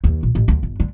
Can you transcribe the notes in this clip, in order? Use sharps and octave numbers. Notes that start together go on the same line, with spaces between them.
D#2
A#1
A1
D2
G1
D3